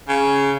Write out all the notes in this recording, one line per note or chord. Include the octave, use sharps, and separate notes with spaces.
C#3